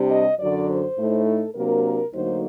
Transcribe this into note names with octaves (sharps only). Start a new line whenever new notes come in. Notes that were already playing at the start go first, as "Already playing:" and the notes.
Already playing: C3 G3 D4
D#5
F#2 D3 F#3 D5
C5
A2 A3 D#4
A4
C3 F#3 A#3 D4 A#4
D2 D3 F#3 A#3 D#4 C5